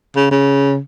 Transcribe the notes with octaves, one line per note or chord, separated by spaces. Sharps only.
C#3
C#3